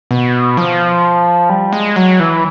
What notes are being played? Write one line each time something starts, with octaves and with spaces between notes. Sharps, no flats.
B2
F3
G3
G#3
F#3
E3